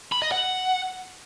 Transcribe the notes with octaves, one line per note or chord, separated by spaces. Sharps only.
B5
D#5
F#5